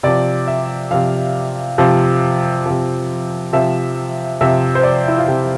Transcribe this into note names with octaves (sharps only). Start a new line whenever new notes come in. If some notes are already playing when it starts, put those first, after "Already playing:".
C3 F3 D5
E5
C3 F3 F5
C3 F3
C3 F3
C3 F3 E5
C3 F3 E5
C5
D5
E4
F4
C3 F3 G4